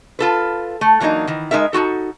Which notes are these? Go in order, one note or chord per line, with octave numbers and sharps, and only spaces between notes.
F4 A4 B4
A3
E3 F#3 A#3 D4 D#4
D#3 E3
G#3 A3 D#4 A#4 E5
D#4 F4 F#4 A4